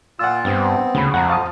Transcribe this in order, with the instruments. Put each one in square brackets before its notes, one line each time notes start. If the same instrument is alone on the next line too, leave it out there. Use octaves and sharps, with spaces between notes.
[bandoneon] A#2 F4 [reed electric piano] F#5 E6
[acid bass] G2 [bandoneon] B3 C4
[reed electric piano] D2 B5 [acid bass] C#3
[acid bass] F2 [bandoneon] F3 [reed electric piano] F#5 A#5
[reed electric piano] F5 A5 D#6